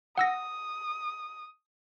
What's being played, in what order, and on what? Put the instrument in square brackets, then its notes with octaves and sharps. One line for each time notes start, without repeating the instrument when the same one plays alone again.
[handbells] F#5 E6 A#6 [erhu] D#6